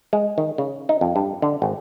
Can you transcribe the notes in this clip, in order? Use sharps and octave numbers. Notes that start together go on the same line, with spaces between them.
G#3
D#3
C#3
D#4
F2
G2
D3
G#1